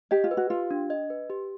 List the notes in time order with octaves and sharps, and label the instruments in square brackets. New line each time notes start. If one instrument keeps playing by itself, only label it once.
[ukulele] G4 [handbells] D#5
[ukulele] F4
[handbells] B4
[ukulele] F#4
[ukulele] F4 [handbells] G4
[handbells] D4
D#5
B4
G4